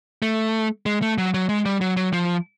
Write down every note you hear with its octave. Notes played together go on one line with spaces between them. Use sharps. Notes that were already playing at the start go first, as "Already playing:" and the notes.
A3
G#3
A3
F#3
F#3
G#3
G3
F#3
F#3
F3